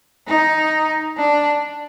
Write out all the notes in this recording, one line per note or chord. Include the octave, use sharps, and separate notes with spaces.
D#4
D4